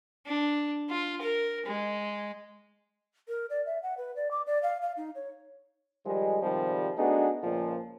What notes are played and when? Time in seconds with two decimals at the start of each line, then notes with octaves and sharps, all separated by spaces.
0.26 D4
0.89 F4
1.21 A#4
1.66 G#3
3.28 A#4
3.50 D5
3.66 E5
3.83 F#5
3.98 B4
4.16 D5
4.31 D6
4.47 D5
4.63 F5
4.82 F5
4.97 D#4
5.15 C#5
6.05 D#3 F3 G3 G#3
6.43 G#2 C3 D#3 F3 G3
6.97 A3 B3 D4 D#4 F#4 G#4
7.43 C#2 A#2 F3